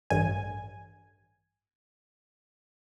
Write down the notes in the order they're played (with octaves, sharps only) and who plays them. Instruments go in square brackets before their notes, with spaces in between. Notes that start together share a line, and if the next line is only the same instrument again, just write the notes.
[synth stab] A1 G2 G#5